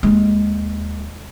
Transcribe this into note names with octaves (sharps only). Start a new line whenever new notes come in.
D#2 G#3